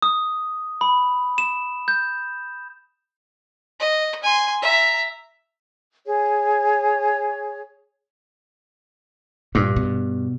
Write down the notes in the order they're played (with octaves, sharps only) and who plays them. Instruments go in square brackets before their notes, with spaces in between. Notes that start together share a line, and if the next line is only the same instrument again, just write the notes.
[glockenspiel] D#6
B5
E7
G6
[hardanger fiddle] D#5
G#5 C6
E5 A#5
[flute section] G#4 C#5
[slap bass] G2 [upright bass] A#2
[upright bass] B2